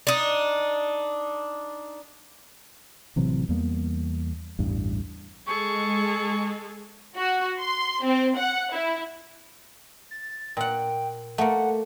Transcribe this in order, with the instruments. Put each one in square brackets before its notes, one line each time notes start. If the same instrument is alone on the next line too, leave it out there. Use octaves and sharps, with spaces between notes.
[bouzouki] D4 D#4
[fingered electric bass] A1 C3 E3 F#3
E2 G3 A#3 B3
A1 E2 G2
[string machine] G#3 [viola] G#4 A4 [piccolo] C#6
[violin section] F#4
C6
C4
F#5
E4
[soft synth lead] A6
[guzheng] A#2 F#5 [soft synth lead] G5
[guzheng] A3 A#3 [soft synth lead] F#5